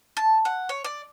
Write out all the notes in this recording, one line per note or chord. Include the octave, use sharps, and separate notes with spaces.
A5
F#5
C#5
D5